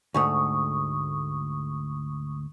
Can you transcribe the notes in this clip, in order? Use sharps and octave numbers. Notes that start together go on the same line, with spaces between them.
D2 G#2 A3 C#6 D#6